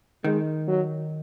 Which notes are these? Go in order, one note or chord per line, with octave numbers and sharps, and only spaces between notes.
D#3 G#3
F#3